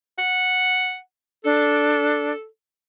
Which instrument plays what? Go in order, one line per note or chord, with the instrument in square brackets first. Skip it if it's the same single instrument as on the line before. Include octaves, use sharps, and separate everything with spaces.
[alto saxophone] F#5
[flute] D4 [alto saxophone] A4